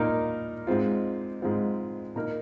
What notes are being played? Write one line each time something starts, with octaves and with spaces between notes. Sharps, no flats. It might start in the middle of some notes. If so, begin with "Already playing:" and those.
Already playing: A#2 A#3 D#4 A#4
G#2 G#3 C4 F4
G#2 G#3 C4 F4
A#2 A#3 D#4 A#4